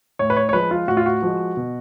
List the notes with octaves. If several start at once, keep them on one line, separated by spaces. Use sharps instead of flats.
A2 C#5
B4
C#5
C#5
F3 G#3 B4
F4
A2 F#4
F4
F#4
F3 G#3
B2